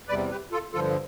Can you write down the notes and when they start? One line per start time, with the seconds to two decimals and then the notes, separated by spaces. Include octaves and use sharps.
0.08 E2 C3 G3 B4 D5
0.30 G4 B4
0.52 F4 A4
0.73 G2 D3 F3 F4 A4